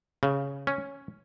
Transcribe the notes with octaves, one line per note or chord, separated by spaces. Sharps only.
C#3
C#4